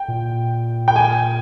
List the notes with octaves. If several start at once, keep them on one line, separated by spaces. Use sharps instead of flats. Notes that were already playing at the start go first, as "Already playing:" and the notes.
Already playing: G5
A#2
G5
G#5